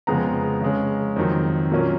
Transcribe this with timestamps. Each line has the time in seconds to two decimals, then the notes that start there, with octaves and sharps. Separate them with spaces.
0.07 F2 C#3 G#3 B3 A#5
0.61 C#3 G#3 C#4
1.16 F2 D#3 F#3
1.71 A#2 F#3 A#3 C#4